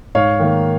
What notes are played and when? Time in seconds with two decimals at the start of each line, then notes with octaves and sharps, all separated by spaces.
0.15 G#2 C#5 F5
0.39 D#3 A#3